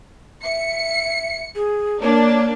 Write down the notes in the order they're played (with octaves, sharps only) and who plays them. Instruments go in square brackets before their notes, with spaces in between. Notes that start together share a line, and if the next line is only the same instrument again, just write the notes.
[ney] E5 [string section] C#7
[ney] G#4
[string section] A#3 D4 [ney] C#5